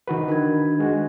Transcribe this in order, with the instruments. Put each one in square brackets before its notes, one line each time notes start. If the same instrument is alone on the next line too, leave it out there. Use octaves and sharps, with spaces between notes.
[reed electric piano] D#3 F#4 B4 [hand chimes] A#4
[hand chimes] D4 B5 G#6
[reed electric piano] G#3 F#4